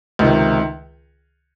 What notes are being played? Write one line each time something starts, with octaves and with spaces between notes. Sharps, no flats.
C#2 C3 D#3